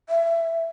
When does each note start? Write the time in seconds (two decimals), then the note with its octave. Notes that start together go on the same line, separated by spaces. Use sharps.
0.09 E5